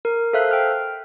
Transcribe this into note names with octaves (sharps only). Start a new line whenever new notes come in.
A#4
A4 C5 E5 F5 F#6
G5 F6